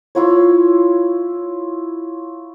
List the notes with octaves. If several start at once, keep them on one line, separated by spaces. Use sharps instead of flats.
E4 F4 C#5